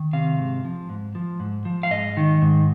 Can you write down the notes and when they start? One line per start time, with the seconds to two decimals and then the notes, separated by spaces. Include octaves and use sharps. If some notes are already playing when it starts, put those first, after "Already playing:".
Already playing: D#3
0.13 C3 F5
0.39 G#2
0.64 F3
0.89 G#2
1.15 F3
1.40 G#2
1.65 F3
1.83 F5
1.91 G#2 D#5
2.17 D#3
2.42 G#2